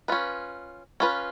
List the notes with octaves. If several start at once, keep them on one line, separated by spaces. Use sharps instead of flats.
C#4 F4 B4
C#4 F4 B4